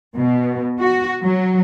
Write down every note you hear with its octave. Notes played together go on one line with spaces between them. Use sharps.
B2
F#4
F#3